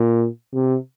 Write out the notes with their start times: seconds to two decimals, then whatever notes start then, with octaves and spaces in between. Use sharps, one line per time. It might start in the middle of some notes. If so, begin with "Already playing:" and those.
Already playing: A#2
0.54 C3